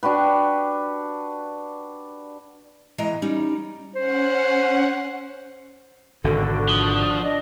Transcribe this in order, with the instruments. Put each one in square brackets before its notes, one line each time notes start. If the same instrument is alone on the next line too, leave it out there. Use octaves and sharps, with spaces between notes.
[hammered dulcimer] D4 F#4 G4 B4
[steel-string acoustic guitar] B2 E3 G#3 D#5 A#5
G3 C#4 D#4
[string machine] C#4 F#5 [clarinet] C5
[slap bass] G#1 B2 D3 [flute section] D4 F#4 [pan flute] A4
[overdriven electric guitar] F3 [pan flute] D#6
[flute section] D4 D5 D#5